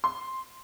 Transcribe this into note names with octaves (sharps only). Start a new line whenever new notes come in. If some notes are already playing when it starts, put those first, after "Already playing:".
C6